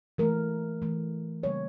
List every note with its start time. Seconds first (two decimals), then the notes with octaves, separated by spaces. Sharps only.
0.18 E3 A3 A#4
0.82 E3 A3
1.43 C#3 E3 G3 A#3 C#5